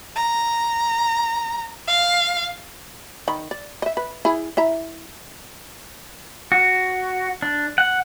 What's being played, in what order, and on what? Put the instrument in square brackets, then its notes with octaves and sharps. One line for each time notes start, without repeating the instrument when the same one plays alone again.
[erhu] A#5
F5
[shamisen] D#3 B5
D5
D#5 E5
B4
E4 G#4
E4 E5 A#5
[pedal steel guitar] F#4
D4
F#5